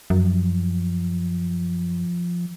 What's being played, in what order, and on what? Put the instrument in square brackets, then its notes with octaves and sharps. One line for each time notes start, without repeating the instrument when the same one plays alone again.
[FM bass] F#2 [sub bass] F3